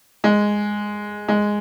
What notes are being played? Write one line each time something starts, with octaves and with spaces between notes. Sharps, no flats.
G#3
G#3